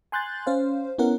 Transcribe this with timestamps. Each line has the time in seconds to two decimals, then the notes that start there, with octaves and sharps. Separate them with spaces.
0.12 G#5 C6 F#6 G6 A6
0.47 C#4 C5 F5
0.98 B3 C#4 E4 A#4 F#5